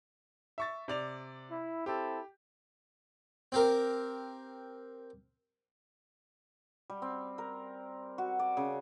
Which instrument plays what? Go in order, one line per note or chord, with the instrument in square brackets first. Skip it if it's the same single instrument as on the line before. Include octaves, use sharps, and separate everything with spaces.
[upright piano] E5 C#6 A6
C3 D5 F7
[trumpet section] E4
[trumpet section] C4 E4 A4 [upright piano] G4
[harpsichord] C4 G4 A#4
[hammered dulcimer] G3
C4
A#4
F#4
D5
C#3